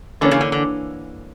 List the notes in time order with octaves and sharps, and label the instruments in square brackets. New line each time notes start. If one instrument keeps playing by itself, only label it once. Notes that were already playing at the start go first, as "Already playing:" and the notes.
[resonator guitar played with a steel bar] D3 [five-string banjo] E3 A#3 C#4
[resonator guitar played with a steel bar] C#3
D3
D3